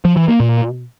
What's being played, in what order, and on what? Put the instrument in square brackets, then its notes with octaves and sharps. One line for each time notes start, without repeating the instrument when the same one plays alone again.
[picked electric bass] F3
E3
A#3
A#2